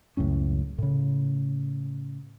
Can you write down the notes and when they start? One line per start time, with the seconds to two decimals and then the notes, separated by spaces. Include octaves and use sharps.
0.17 C#2 F#2 A2 C#4
0.78 A2 C#3